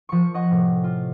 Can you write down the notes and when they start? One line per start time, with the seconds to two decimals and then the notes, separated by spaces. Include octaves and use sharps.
0.09 F3 C#6
0.34 D#5 F#5 C#6
0.51 A2 C3
0.84 F4